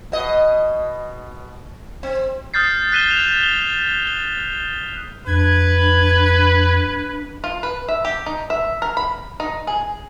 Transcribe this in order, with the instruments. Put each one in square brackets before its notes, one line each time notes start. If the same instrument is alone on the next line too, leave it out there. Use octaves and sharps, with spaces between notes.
[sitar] B2 D#5
C4
[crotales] D#6 F6 G6 A6 C7
F#6 B6 D#7 E7 G7
E7 F7
G7
G7
[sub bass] F2 [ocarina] D4 [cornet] B4 [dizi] G#6
[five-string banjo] F4
B4
E5
G4
D#4
E5
A#4
B5
D#4
G#4